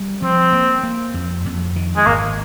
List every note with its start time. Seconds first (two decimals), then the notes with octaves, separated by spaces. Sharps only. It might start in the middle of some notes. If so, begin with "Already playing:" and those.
Already playing: G3
0.22 F3 C4
0.53 A#3
0.83 A#3
1.14 F2
1.46 F2
1.76 D#3
1.97 G#3
2.06 G#1 A#3